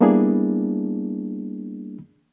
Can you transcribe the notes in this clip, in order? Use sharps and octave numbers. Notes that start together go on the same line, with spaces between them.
G3 A#3 B3 D4 E4 G#4